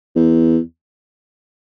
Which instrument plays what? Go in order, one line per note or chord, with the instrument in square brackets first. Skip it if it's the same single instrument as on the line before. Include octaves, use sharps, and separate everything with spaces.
[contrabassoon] E2